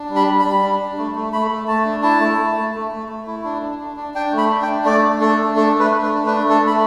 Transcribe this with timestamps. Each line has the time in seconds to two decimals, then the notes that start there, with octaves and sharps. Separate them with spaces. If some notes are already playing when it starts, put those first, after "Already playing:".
Already playing: D4
0.09 G3
0.16 B5
0.28 G3
0.39 B5
0.45 G3
0.63 D4
0.79 D4
0.98 A3
1.15 A3
1.33 A3 B5
1.51 A3
1.68 A3 A5
1.85 D4
2.03 E4 A5
2.20 A3
2.38 A3
2.56 A3
2.74 A3
2.91 A3
3.09 A3
3.27 E4
3.45 D4
3.62 D4
3.79 D4
3.97 D4
4.14 D4 G5
4.33 A3
4.38 B5
4.50 D4
4.62 G5
4.68 D4
4.85 A3 D5
5.02 D4
5.20 A3 A4
5.38 D4
5.55 A3 A4
5.73 A3
5.79 B4
5.90 D4
6.03 B4
6.08 A3
6.26 D4 B4
6.43 A3
6.50 A4
6.61 A3
6.67 B5